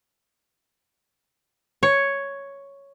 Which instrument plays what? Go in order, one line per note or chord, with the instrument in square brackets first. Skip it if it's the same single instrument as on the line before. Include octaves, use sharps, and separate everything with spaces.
[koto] C#5